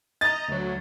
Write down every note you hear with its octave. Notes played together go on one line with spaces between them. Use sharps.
D#5 A#5 A6
D2 F#3